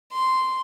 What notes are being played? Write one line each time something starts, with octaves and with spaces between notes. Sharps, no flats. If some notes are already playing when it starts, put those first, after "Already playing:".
C6